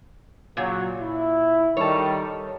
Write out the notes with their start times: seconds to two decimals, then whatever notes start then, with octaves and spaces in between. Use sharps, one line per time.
0.57 A#2 C#3 F#3
1.01 E4
1.77 D#3 G3 A4 C#5